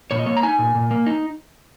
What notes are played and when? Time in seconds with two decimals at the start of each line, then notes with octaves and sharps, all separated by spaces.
0.11 A#2 C#5
0.19 D#5
0.26 A#3 C#5
0.37 A#5
0.43 D#4 G#5
0.59 A#2
0.75 A#2
0.91 A#3
1.06 D#4